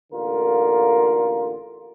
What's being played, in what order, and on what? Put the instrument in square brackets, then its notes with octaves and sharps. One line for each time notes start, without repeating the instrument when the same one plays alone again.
[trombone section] A1 D3 A#3 F4 A#4